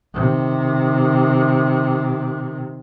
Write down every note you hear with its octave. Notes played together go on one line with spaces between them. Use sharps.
C3 D#3